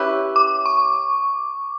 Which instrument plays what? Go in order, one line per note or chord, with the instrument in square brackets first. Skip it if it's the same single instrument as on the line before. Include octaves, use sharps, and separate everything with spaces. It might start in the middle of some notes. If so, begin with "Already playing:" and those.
Already playing: [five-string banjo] C#4 E4 G4 B4
[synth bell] D6
C#6